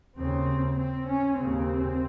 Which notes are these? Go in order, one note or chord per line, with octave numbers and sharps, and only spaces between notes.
D#2 C#3 C4
C4
C#4
D#2 C#3 C4